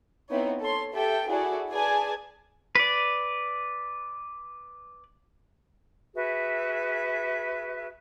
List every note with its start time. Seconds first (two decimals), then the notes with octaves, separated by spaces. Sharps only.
0.30 B3 C4 D#4 E4 C#5
0.60 A4 C#5 C6
0.93 G4 A4 E5 G5
1.27 E4 F#4 G#4 A4 D5
1.71 G#4 B4 D5 G#5 A5
2.75 B4 D5
6.15 F#4 G#4 B4 E5